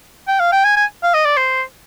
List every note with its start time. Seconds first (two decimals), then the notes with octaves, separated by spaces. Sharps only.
0.28 G5
0.40 F5
0.53 G5
0.64 G#5
0.76 G#5
1.03 F5
1.14 D#5
1.25 D5
1.37 C5